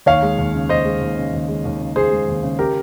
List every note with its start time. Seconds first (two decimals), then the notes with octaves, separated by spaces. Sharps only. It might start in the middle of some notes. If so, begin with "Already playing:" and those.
0.06 D#2 C#5 F5
0.22 G#3
0.38 D#2
0.54 C#3
0.69 D#2 C5 D#5
0.85 G#3
1.01 D#2
1.18 C#3
1.33 D#2
1.48 G#3
1.65 D#2
1.80 C#3
1.96 D#2 G#4 C5
2.11 G#3
2.28 D#2
2.43 C#3
2.59 G4 A#4